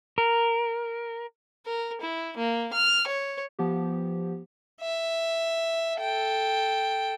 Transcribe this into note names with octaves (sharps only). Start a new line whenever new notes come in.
A#4
A#4
E4
A#3
F6
C#5
F3 B3 G4
E5
A4 G5